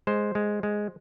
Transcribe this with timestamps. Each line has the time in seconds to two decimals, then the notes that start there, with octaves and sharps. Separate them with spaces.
0.07 G#3 C5
0.35 G#3
0.63 G#3